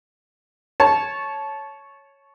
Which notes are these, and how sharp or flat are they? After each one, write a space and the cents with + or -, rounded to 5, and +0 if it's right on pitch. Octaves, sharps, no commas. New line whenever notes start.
C#5 +0 A5 -20